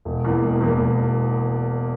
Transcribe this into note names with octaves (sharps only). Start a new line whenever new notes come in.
E1
E2 E3 A#3
E1
E2 E3 A#3
E1